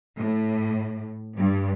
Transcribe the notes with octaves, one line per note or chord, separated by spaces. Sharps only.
A2
G2